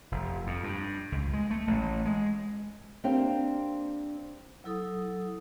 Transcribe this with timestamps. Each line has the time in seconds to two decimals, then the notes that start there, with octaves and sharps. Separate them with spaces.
0.12 F1
0.47 F2
0.64 G2
1.12 C#2
1.33 G#3
1.51 A3
1.67 A1
2.05 G#3
3.04 A#3 C4 D4 G4 F5 G5
4.64 F#3 E4 A4 D#6